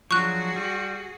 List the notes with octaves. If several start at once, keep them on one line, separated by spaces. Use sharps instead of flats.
F3 F#3 D4 F#4 G#4 C#6 F#6
G3